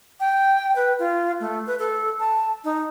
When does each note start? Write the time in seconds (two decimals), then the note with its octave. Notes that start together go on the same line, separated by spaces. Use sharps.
0.20 G5
0.76 B4
0.99 F4
1.40 A3
1.67 B4
1.79 A4
2.20 A5
2.64 D#4